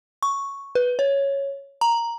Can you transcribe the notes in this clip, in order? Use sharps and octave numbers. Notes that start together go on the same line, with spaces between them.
C#6
B4
C#5
A#5